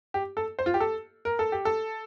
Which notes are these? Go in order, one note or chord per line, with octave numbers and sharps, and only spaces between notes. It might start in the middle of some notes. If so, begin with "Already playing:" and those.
G4
A4
C5
F4
G4
A4
A#4
A4
G4
A4